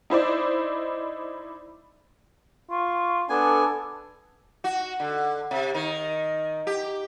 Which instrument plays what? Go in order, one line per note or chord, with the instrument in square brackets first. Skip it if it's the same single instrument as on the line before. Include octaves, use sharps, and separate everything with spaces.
[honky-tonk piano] D#4 E4 C5 D5
[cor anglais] F4 [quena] C#6
[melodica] B3 G#5 [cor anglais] D4 [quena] A4
[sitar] F#4
D3
C3
D#3
G4